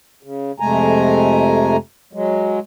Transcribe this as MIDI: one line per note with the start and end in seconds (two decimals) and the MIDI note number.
0.23 0.52 49
0.60 1.77 41
0.60 1.77 48
0.60 1.77 56
0.60 1.77 57
0.60 1.77 80
0.60 1.77 82
2.13 2.59 54
2.13 2.59 56